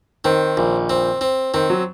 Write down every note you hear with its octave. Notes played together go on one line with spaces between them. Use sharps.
D#3 C4
A#1
C4
C4
D#3 C4
F#3